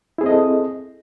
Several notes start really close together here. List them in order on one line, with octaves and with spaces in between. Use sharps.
E4 G#4 C4 D#5 A4